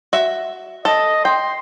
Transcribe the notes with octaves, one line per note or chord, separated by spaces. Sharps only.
F#4 E5
A4 D#5
G5 C6